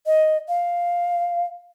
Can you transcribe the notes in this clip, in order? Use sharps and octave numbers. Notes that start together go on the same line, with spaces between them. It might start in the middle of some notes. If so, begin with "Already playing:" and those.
D#5
F5